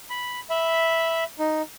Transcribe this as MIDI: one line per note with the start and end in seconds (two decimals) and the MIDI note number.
0.10 0.40 83
0.50 1.24 76
0.50 1.24 83
1.39 1.62 63